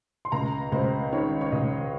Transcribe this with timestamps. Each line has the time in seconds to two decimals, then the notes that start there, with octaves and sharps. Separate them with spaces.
0.25 C6
0.32 C#2 A#5
0.72 C#2 C5
1.12 D#3 C#5
1.41 C#5
1.52 C#2 D#5